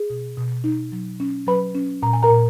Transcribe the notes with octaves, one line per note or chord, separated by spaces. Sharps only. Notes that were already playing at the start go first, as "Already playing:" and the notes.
Already playing: G#4
B2
B2
D#4
F#3
C#4
F#3 B4 B5
C#4
A#2 A#5
G#5
A#4 A#5
A#2